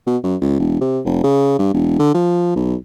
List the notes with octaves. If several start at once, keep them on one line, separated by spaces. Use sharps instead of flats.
B2
F#2
C#2
E1
C3
F1
C#3
G2
E1
D3
F3
B1